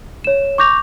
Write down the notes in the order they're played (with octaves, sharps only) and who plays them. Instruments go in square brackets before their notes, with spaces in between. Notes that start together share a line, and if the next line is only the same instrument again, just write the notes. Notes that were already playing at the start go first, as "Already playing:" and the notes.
[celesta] C#5 E7
C#6 D6 G6 A#6 F7